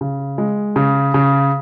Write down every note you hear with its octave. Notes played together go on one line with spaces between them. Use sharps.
C#3
G#3
C#3
C#3